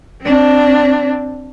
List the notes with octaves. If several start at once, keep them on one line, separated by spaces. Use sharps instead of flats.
C4 D4